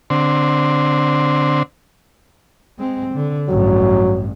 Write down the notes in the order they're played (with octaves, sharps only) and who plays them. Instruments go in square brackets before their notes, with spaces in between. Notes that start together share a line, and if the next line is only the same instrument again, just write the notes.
[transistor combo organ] D3 C4
[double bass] G#3 C4
D3
[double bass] A1 G2 [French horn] F#3